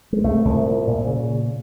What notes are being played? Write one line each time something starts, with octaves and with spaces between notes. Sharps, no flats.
G#3
C2 A3
C2
A#2
A#2
C#3